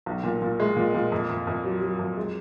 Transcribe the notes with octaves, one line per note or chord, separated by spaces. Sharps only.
B1
A#2
A#2
G#3
A#2
A#2
F2
F2
F2
F#3
F#3
F2
G#3